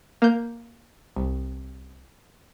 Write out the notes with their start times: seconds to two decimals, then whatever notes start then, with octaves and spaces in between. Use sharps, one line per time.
0.22 A#3 G6
1.16 C2